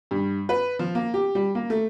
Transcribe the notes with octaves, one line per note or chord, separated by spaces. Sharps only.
G2
B4
F3
A#3
G4
G3
A#3
A3